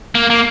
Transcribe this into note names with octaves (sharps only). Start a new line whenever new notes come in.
A#3
A#3